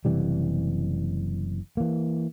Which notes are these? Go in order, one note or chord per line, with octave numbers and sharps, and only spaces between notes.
F#1 C3 E3 G3
E3 A#3